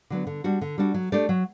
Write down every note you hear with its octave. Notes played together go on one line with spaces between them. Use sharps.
D3 F#3 B3
D3
G3 D4 F#4
D3
G3 D4 F#4
F#3
A3 D4 G4 D5
F#3